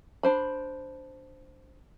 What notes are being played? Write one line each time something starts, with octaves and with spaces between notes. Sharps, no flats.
D4 C5 B5